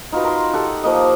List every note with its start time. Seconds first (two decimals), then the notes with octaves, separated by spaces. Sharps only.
0.12 D#4 F4 F#4 B4
0.24 A#4 A#5 C6
0.53 G4 A4 F#5
0.84 F3 A#3 D#5